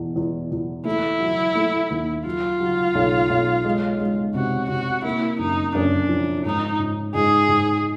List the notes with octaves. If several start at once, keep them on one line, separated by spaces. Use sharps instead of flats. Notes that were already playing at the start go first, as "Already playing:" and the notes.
Already playing: E2 B2
E2
E2
A3 E4
F#3
A3
D#2
F#3 F4
F#3
B1
B1
G#3
G#3
C3 F#4
C3 F#4
A#3 E4
F#2 D#4
F#2 D4
F3
G#2 D#4
G#2
G#2 G#4
G#2